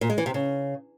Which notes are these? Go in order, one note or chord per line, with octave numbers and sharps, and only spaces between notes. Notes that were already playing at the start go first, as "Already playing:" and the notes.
A#2
G#3
E3
C3
C#3